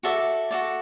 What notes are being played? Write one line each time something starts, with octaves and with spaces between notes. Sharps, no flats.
F#4 A4 D5 E5
F#4 A4 D5